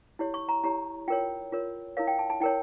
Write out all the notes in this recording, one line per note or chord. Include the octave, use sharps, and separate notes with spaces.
E4 G4 C#5
C#6
A#5
E4 G4 C#5 A#5
F4 A#4 C#5 G5
F4 A#4 C#5
E4 A#4 C#5 F5
G5
A5
A5
E4 A#4 C#5 G5